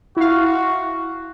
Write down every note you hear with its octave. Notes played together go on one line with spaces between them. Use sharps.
E4 F#4 F5